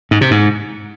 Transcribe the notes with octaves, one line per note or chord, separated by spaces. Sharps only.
G#2
C3
G#2